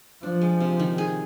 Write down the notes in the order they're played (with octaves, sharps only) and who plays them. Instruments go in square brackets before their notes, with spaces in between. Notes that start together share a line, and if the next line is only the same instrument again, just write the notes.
[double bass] F3 [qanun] D4
[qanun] G#3
C3
D#3
G#4